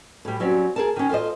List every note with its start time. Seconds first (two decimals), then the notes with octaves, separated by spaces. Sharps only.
0.25 A2 G3
0.40 F#3 G3 C4 C#4
0.76 G#4 A#4 A5
0.96 D#3 C#4
1.09 F4 A4 B4 C5 D#5